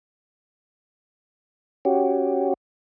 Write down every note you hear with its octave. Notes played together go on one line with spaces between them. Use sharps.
C#4 F#4 G4